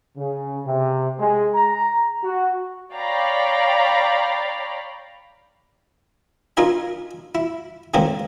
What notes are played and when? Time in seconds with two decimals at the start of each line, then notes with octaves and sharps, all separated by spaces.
0.17 C#3
0.66 C3
1.20 G#3
1.55 A#5
2.24 F#4
2.93 C#5 D5 F5 G5 A#5 B5
6.57 D4 D#4 F4 A#4 D#5 G#5
7.35 E4
7.94 G#2 D3 D#3 A#3 C4 C#4